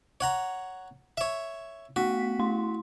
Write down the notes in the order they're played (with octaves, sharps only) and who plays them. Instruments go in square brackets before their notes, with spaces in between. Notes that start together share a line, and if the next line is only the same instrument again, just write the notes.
[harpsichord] C#5 F#5 A#5
C#5 E5
[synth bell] A3 B3 B6 [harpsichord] F#4
[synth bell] A3 E4 C6